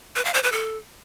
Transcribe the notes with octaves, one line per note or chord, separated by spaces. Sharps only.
B4
F5
C5
B4
A4